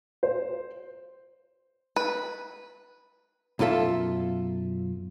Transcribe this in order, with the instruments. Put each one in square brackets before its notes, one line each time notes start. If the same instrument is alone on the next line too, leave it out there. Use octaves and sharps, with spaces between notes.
[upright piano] C5
[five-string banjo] B4
[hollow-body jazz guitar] B1 F#2 F4 A4 E5